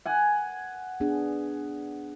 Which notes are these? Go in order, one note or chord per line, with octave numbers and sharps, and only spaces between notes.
F#5 G#5
B3 D4 G#4